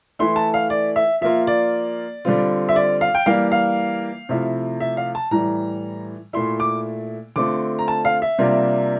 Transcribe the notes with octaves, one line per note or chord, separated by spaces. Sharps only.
E3 A3 E4 C6
A5
F5
D5
E5
F3 A#3 F4 E5
D5
D3 G3 C4 F4
E5
D5
F5
G5
E3 G3 A#3 F5
F5
C3 F3 A3 E4
E5
F5
A5
A2 E3 G3 A#5
A#2 A3 E4 C6
D6
D3 A3 C4 F4 D6
A#5
A5
F5
E5
C3 G3 A#3 D4 F4